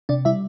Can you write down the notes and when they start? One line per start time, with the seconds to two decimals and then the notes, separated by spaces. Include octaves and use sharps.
0.09 C3 D4 D5
0.25 G3 E4 E5